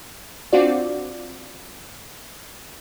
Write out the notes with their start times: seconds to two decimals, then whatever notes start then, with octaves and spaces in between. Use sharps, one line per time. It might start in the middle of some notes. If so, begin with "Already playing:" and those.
0.53 C4 D4 F4 F#4 D5